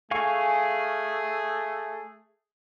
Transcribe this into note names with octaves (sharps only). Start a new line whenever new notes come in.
A3 G#4 F5 G#5 C#6